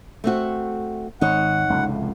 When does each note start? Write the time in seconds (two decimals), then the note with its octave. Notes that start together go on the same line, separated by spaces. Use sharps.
0.24 A3 C4 F#4
1.21 G#1 D#4 C#5 F#5
1.69 F1 C#2 A2